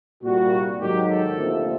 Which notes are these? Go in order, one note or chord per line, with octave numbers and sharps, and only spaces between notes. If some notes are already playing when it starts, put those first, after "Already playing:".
C2 A#2 G3 A#3 F#4
G#2 D#3 F#3 G4
A4
D2 C3 F3 A#3